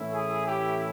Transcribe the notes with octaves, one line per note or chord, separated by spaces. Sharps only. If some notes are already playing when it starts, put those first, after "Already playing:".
Already playing: A2 E3 A3 C#4 E4
G#4
G4